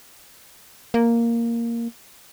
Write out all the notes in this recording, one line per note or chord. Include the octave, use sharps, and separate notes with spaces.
A#3